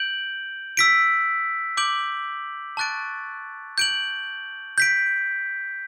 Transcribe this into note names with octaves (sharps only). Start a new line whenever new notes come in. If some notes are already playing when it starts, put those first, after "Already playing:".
Already playing: G6 D7 F#7
E6 B6 D7
D6 G6 D7 F#7
A5 C#6 F#6 A6 D7
G6 D7 F#7
G6 B6 D7